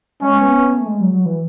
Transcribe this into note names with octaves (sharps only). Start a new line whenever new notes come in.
G#3 C#4
B3
B3
A3
G#3
F#3
F#3
E3